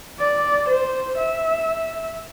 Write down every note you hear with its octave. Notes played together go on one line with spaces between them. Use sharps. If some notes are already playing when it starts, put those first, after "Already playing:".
D5
C5
E5